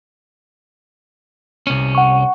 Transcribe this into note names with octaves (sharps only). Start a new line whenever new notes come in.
C2 C#4
F#5 C#6